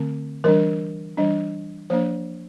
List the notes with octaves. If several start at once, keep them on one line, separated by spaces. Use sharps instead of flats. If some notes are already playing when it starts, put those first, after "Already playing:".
Already playing: D3 A3 C4
E3 G3 D4 A#4
E3 G3 D4
F3 A#3 D4 C5